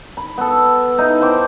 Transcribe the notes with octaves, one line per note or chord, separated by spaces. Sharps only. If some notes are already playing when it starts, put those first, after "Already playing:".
B5
B3 A4
D#4 E4
C5 F5 G5 D6